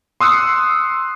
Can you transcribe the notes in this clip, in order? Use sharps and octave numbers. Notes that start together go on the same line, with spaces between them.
C6 D#6 E6 F#6 C#7